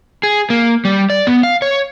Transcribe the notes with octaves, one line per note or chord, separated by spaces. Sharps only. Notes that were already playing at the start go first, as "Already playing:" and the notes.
G#4
A#3
G3
D5
B3
F5
C#5